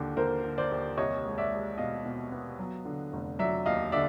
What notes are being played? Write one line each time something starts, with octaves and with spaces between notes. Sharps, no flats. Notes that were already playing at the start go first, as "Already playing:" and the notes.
Already playing: D#2 D3
A#3 A#4 C5
D3
C5 D5
D#2
C2 C#5 D#5
G#3
D5 E5
G#3
B2 D#5 F5
B2
B3
F#3
D3
F1
F#3 D5 E5
D#2 D#5 F5
D3 D5 E5